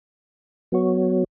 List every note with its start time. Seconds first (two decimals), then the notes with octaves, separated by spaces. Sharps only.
0.72 F#3 B3 F#4 C#5